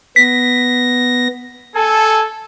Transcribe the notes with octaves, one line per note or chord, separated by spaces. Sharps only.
B3 A#6 B6
A4 G#5